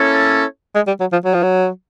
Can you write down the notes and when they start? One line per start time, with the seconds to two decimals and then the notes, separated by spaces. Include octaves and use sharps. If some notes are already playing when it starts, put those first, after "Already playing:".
Already playing: A#3 C#4 E4 A4 C#5
0.75 G#3
0.87 G3
1.00 F#3
1.12 F3
1.25 F#3
1.34 F3
1.43 F#3